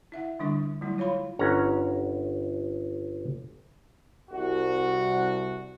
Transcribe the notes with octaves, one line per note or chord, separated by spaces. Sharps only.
E4 E5 F#5
D3 G3 D4 C#6
F#3 G3 A3 E4
F4 C#5 F5 B5 C6
G1 C#4 F#5 A#5
C2 F#4